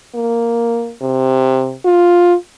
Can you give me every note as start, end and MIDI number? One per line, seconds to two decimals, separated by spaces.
0.15 0.92 58
1.02 1.75 48
1.85 2.34 65